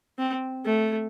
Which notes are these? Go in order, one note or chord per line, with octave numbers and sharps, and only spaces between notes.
C4
A3